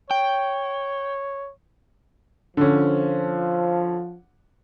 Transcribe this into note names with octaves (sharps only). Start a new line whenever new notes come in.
C#5 G5
D3 F3 C#4